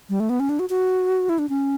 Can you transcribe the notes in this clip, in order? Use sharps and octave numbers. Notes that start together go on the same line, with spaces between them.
G3
A3
B3
C#4
D4
F#4
F#4
E4
D4
C#4